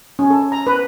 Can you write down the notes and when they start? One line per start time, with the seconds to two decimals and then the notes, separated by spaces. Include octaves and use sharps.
0.19 C#4
0.30 A4
0.52 A#5
0.67 B4